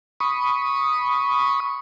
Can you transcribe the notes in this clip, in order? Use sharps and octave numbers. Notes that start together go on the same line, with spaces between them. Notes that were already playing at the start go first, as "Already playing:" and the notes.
B5 C#6 D#6